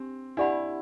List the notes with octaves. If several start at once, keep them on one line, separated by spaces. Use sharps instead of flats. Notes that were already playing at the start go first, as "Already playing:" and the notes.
Already playing: C4 D4 G4
D4 E4 G4 D5 F#5 B5